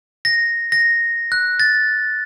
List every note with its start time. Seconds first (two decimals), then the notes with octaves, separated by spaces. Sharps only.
0.25 A#6
0.72 A#6
1.32 F#6
1.60 A6